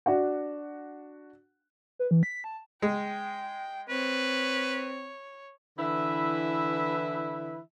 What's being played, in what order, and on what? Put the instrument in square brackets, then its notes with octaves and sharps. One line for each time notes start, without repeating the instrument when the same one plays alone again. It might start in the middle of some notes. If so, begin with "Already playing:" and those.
[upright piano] D4 F#4 F#5
[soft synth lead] B4
E3
B6
A5
[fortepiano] G#3 [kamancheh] G5
[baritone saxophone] C4 [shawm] B4 [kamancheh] C#5
[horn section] D3 E3 E4 B4 E5